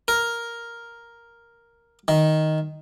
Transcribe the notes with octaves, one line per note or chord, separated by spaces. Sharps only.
A#4
D#3